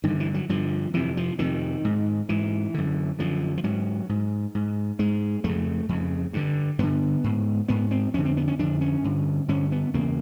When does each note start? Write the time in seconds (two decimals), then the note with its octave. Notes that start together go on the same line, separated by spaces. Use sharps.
0.04 G2 D3 D#3
0.20 E3
0.34 F#3
0.49 G2 D3 F3
0.94 F2 C3 E3
1.17 F3
1.39 F2 C3 D#3
1.85 G#2
2.29 G#2 E3
2.74 F#2 D3
3.19 F#2 D3 F3
3.57 F3
3.64 G#2 F#3
4.09 G#2
4.55 G#2
4.99 G#2 G#3
5.44 F2 A3
5.49 C#3
5.89 F2 C#3
6.33 G2 D3
6.79 G2 D3 B3
7.24 G#2
7.68 G#2 B3
7.91 C4
8.14 F2 D3 C#4
8.25 C4
8.37 B3
8.48 C#4
8.59 F2 D3 D4
8.81 C#4
9.04 G2 D3
9.48 G2 D3 C#4
9.72 B3
9.93 E2 C#3 A#3